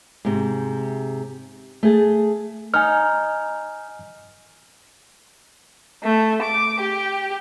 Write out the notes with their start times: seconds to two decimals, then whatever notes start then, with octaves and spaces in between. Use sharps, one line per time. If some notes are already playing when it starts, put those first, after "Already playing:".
0.25 G#2 C3
1.83 A3 G#4 A5
2.74 D#4 G#5 F6
6.02 A3
6.41 D6
6.80 G4